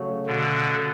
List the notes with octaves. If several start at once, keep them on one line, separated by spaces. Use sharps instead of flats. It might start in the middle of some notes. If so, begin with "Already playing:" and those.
Already playing: C#3 F#3 A3
B2 D3